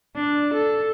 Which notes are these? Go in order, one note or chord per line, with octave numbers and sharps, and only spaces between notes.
D4
A4